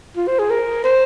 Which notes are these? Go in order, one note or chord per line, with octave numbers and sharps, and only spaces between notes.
F4
C5
G#4
A#4
C5